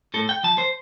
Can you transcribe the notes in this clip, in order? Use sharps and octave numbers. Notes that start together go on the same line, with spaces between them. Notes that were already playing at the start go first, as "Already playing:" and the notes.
A2 A4
G5
F3 A5
C5